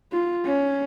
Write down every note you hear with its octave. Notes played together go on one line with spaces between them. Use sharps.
F4
C#4